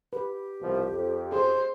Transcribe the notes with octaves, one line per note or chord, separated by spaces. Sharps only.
G4 B4
C2 B2 F3
F2
G#4 C5